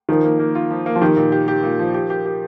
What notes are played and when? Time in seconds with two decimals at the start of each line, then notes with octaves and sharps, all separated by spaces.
0.09 D#3 F3
0.24 A#3
0.39 A#3
0.55 F4
0.70 F3
0.86 A#3
0.96 F3
1.02 D#3 G4
1.17 A#2
1.32 G4
1.48 G4
1.63 A#2
1.79 F3
1.94 G4
2.10 G4
2.26 G4